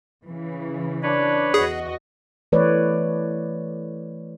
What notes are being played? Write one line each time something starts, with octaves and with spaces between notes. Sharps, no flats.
C#3 E3
D4 B4 C#5
E2 F#4 G#4 D#5
E3 A3 B4 C#5 D5